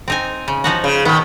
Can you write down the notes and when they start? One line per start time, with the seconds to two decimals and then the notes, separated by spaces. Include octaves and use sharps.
0.08 C4 D#4 G#5
0.48 C#3
0.64 F3 D#4 F#4
0.84 C#3
1.05 B2 D#3 B3